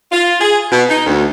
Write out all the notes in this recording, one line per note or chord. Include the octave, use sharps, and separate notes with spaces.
F4
G#4
B2
D#4
D2